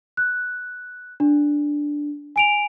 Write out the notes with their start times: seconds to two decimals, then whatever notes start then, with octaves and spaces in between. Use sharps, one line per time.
0.17 F#6
1.20 D4
2.36 G#5 D7 F7